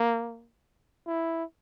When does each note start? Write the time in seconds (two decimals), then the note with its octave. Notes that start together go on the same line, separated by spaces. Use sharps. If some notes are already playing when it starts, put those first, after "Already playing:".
Already playing: A#3
1.07 E4